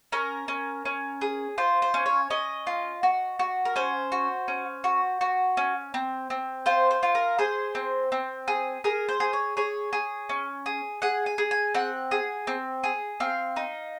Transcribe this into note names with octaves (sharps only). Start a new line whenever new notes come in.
C#4 A#4
C#4
C#4
G#4
F4 C5
C5
C#4
C#5
C#4 D#5
F4
F#4
F#4
A#4
C#4 C5
F#4
C#4
F#4
F#4
C#4
C4
C4
F4 C5
C5
F4
A#4
G#4 C5
C4
C4
G#4
G#4 A#4
C5
G#4
C#5
G#4 C#5
G#4
C#4
G#4
G#4 F#5
G#5
G#4
G#5
C4 F#5
G#4
C4
G#4
C4 F5
D#4